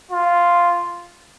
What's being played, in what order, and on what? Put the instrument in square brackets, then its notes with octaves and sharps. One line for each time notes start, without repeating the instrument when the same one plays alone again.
[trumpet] F4